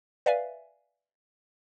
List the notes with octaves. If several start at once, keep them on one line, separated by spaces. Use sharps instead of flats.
B4 D5 E5 F5 G#5